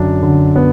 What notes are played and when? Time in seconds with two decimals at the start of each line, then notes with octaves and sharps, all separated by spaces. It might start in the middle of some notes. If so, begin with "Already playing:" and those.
Already playing: F#2 D3 D4
0.22 D3
0.56 B3